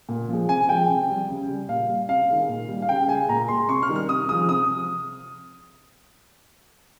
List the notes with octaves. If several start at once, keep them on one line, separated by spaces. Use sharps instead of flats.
A#2
F3 G#3
C3 G#5
F3 G#3 G5
C3
G3
C#3
G3
A#2 F5
G3
C3 F5
D#3 G#3
A#2
G3
F5
C#3 G5
G#3 G#5
A#2 A#5
G#3 C6
C3 C#6
F6
D#3 G3
F6
C3 D#6
F3 G#3 D#6
C3 D#6